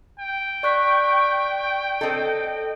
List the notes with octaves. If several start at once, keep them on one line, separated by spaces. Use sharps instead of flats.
G5
D5 C#6 F#6 B6
C4 A4 D#5